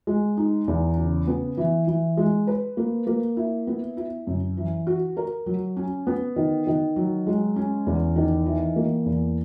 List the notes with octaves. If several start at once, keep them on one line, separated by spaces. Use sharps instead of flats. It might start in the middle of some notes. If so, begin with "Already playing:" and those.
G#3
D#4
E2
C#3
B3
E3
E3
G#3
B4
A#3
A#3
E4
B3
E4
F#2
E3
F#4
A#4
F#3
C#4
B3
D#3
D#3
F#3
G#3
C#4
E2
D#3
E3
A#3
E2